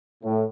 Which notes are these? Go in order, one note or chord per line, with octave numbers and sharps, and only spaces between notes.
A2